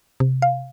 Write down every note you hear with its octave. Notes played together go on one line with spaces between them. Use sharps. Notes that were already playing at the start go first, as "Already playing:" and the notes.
C3
F5